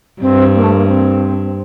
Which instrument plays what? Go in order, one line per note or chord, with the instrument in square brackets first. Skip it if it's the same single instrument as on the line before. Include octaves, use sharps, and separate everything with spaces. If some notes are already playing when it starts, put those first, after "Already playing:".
[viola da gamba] G2 [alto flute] C4
[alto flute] A#3
A3
A#3
C4